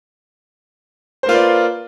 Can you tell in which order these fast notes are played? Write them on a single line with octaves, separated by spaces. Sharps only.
C5 A#3 F4 B4 D5